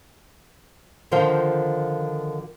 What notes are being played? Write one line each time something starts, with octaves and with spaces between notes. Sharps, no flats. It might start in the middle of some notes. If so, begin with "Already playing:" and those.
D3 D#3 F3 F4 A#4 C5